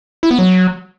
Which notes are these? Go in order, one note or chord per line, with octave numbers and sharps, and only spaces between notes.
E4
B3
F#3